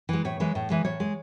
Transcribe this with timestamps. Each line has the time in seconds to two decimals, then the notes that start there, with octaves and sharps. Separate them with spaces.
0.09 E3 G#3
0.25 A2 C#5
0.40 E3 G#3
0.55 A2
0.70 E3 G#3
0.85 A2 C#5
1.00 G#3